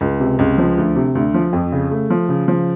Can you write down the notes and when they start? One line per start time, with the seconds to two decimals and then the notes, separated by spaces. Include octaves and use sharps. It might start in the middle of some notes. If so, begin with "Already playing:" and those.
0.01 C#2
0.20 C3
0.39 C#2
0.58 F3
0.78 D2
0.96 C3
1.15 D2
1.34 F3
1.53 F2
1.72 C#3
1.91 A3
2.10 F3
2.29 C#3
2.48 F3